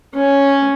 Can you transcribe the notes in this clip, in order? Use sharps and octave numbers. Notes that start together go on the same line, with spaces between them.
C#4